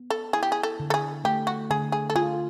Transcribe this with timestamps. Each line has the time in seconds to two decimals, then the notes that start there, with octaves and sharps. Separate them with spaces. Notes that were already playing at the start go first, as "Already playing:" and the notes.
Already playing: B3
0.10 A4
0.33 E4 G#4
0.43 G4
0.52 G#4
0.63 A4
0.80 D3
0.90 A4
0.94 G#4
1.24 A3 G4
1.47 F#4
1.70 D3 G#4
1.92 G#4
2.10 A4
2.15 F4 G#4